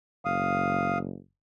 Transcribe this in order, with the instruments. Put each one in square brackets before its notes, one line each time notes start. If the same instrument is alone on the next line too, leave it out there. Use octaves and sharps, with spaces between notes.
[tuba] F#1 [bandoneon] F5 D#6